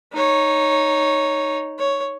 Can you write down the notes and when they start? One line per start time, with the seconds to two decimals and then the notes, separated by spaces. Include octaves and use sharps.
0.13 D#4 C#5
1.79 C#5